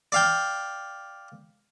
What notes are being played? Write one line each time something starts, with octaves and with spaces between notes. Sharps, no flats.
D5 F5 G5